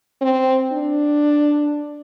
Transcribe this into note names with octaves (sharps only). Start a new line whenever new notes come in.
C4
D4